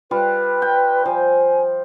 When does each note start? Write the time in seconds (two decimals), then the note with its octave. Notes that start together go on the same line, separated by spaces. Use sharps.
0.11 G3 F4 B4
0.62 G5
1.06 F3 G#5